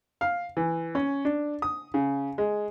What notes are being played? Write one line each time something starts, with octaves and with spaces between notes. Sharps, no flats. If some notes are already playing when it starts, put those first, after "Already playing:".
F5
E3
C#4
D4
D#6
C#3
G#3